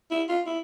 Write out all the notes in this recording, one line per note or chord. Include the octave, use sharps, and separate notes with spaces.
E4
F4
E4